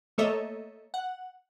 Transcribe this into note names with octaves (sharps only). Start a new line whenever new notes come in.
A3 A#3 A4 C#5 D#5 E5
F#5